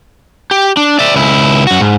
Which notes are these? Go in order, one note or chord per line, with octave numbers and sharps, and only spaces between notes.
G4
D4
D5 E5
C#2 E4
F#2 F#4
G#2